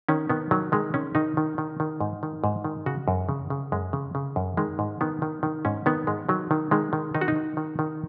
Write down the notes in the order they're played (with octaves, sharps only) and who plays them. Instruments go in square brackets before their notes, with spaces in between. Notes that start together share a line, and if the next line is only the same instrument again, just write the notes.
[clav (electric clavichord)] D#3 C#4
D#3 B3
D#3 F#3
D#3 G#3
D#3 C#4
D#3 D#4
D#3
D#3
D#3
G#2
D#3
G#2
D#3
C#3 F#4
F#2
C#3
C#3
F#2 G#3
C#3
C#3
F#2
D#3 G#3
G#2
D#3 B3
D#3
D#3
G#2 C#4
D#3 B3
G#2 G#3
D#3 F#3
D#3
D#3 G#3
D#3
D#3 D#4
F#4
D#4
D#3
D#3
D#3